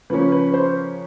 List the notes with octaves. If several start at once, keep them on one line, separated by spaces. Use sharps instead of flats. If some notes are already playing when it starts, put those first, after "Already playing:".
C#3 F3 A#3 C#4 B4
B4
C5